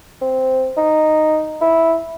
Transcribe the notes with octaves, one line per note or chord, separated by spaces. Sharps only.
C4
D#4
E4